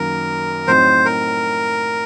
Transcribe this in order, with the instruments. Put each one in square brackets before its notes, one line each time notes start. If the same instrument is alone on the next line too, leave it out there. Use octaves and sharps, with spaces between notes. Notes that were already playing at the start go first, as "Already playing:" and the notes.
Already playing: [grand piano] F#2 D#3 A#3 [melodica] A#4
[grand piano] A2 F#3 C4 D#4 [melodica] C5
[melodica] A#4